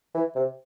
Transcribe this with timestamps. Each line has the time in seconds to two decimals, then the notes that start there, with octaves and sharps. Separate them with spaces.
0.14 E3
0.36 C3